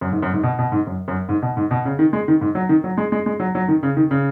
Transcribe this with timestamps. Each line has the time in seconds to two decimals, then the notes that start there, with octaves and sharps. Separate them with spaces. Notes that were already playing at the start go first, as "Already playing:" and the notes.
0.01 F#2
0.12 G#2
0.22 F#2
0.33 G#2
0.43 B2
0.59 B2
0.72 G#2
0.87 F#2
1.08 F#2
1.29 G#2
1.42 B2
1.57 G#2
1.71 B2
1.85 C#3
1.99 D#3
2.13 G#3
2.28 D#3
2.41 G#2
2.55 F#3
2.69 D#3
2.84 F#3
2.98 G#3
3.12 G#3
3.26 G#3
3.40 F#3
3.55 F#3
3.68 D#3
3.83 C#3
3.97 D#3
4.11 C#3